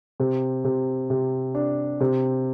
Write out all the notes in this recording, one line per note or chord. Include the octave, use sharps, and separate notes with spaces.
C3
C3
C3
D4
C3